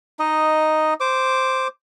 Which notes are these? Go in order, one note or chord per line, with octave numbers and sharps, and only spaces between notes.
D#4 D#5
C5 D6